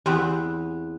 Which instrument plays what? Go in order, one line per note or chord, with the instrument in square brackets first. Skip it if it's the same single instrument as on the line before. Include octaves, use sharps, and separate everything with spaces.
[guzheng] E2 B3 C4 [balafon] G4 C6